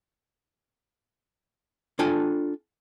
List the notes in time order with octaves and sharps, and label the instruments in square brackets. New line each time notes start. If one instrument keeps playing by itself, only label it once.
[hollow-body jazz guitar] D4 F4 A4 G5 G#5